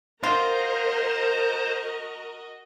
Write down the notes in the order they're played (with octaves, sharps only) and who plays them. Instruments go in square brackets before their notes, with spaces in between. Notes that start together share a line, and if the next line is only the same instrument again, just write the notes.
[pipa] F4 [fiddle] F#4 D#5 [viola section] A#4 A#5 [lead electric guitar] C5